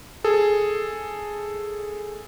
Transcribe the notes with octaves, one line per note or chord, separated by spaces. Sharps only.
G#4 A4